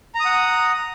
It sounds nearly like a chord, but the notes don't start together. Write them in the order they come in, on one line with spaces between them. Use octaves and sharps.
A#5 D#6 F#5